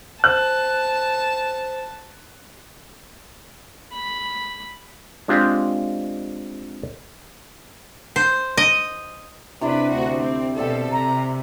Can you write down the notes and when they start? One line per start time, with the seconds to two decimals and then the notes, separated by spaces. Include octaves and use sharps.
0.24 C5 A5 F#6
3.93 B5
5.28 G#3 C4 D4 F4 G4
8.16 C5
8.57 D#5
9.61 C3 D4 E4 B4 D5
9.90 D2 F#4
10.20 C4
10.57 B2 A4 D5 E5 G5
10.92 C3 A#5